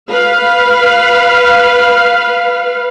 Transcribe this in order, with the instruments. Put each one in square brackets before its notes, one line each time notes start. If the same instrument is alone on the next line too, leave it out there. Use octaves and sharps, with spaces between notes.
[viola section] B4 F5